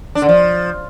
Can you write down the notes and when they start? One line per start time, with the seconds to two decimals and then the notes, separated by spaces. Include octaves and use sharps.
0.15 D4
0.22 D3
0.29 F3